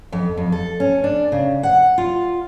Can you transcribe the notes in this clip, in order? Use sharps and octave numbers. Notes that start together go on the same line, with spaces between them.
F2
F2
A4
C#4
D4
C#3
F#5
F4